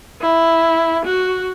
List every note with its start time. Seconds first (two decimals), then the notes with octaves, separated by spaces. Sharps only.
0.22 E4
1.05 F#4